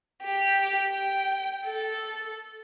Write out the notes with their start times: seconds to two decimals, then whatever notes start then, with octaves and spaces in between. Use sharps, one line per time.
0.24 G4
0.90 G5
1.66 A4